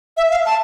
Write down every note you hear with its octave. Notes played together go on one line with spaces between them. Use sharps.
E5
F5
A5